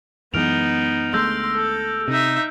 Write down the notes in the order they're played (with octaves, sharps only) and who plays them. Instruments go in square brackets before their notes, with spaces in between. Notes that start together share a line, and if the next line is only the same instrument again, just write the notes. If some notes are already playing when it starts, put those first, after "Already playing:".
[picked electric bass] F#2 E3 G#3 [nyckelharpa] B3 D#4 [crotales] F6 D7 F7
[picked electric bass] D2 G#3 A3 [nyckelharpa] C6 [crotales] E6 G6 A#6
[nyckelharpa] A4
[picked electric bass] C3 [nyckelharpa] D#4 E5